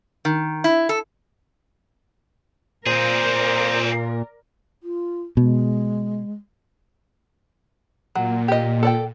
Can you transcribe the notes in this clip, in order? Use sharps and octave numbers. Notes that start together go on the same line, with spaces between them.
D#3
E4
A4
A#2 C4 G#4 A#4 C5 D5
F4
B2 G#3
A#2 F#3
G4 D#5
A4 D5 G5